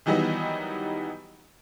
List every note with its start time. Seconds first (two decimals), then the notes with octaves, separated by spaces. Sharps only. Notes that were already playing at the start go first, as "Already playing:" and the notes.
0.06 D#3 E3 F#3 G3 B3 D#4